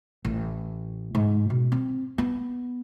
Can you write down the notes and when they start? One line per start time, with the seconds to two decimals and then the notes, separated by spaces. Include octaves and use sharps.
0.25 A1
1.15 G#2
1.50 B2
1.72 C4
2.18 B3